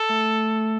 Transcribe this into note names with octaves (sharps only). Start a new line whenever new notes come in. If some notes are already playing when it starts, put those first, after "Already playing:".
Already playing: A4
A3